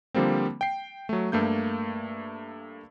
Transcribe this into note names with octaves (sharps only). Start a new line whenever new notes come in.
D3 F3 G3 A#3 C4
G5 C7
F#3 A3
G2 A3 A#3 G6